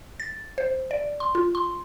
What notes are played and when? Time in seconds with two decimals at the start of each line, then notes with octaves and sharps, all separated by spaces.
0.20 A6
0.58 C5
0.91 D5
1.20 C6
1.35 F4
1.55 C6